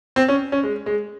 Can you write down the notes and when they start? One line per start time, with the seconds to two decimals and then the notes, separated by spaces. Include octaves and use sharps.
0.16 C4
0.28 C#4
0.52 C#4
0.63 G#3
0.86 G#3